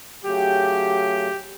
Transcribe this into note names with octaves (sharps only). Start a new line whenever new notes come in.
C#3 F#3 A3 G4